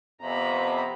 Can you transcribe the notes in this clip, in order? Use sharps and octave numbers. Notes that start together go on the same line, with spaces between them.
F2 C3 B3 A#5 B5